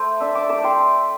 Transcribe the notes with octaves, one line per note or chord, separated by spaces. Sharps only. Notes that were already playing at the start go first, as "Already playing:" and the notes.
Already playing: A3 C5
D4 E5 A5
A5 D6
A3 A5 D6
G5 C6